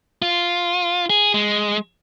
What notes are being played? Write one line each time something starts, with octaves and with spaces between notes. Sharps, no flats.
F4
G#4
G#3